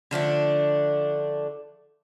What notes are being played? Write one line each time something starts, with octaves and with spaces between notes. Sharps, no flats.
D3 F3 A3 D4